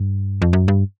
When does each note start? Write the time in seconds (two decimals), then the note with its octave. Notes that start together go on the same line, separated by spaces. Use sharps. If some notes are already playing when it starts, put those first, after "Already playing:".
Already playing: G2
0.42 F2
0.53 F#2
0.68 G2